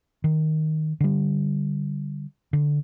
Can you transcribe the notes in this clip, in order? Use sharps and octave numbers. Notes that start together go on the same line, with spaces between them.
D#3
D3 G3
D3